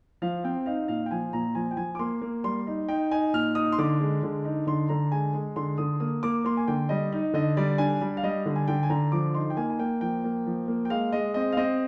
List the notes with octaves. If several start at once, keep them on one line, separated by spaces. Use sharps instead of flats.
F3 F5
C4 G5
D#4 F5
A#2 F5
G5
F3 G#5
A#2 A#5
F3 G#5
G5
F3 G#5
D6
A#3 C6
A#3
G3 C6
D#4
D#4 G5
D#4 G#5
A#2 F6
D#4 D#6
C6
D3 D6
G#3
D3
D#4
D3 C6
D3 A#5
G#3 G#5
G#3
D3 C6
D3 D#6
A#3 D#6
A#3 D6
A#3 C6
G#5
D3 G5
G3 D#5
D#4
D3 D#5
G3 D5
D4 G#5
G3
F5
G3 D#5
D3
G#5
D3 G5
G#5
D3 A#5
F3 D6
D#4 C6
G5
A#3 G#5
G#5
A#3 G5
F3 G5
A#3
F3
A#3
G5
G#3 F5
G#3 D#5
C4 D#5
F5
C4 D#5